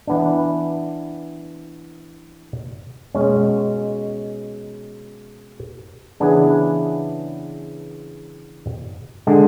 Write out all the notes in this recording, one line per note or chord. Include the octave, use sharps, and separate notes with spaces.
E3 B3 D4
B2 G#3 C#4
C#3 E3 B3 D4 G#4
D3 G#3 D4